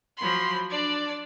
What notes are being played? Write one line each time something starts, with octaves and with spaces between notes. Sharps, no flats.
F3 F#3 B5 C6
D4 D5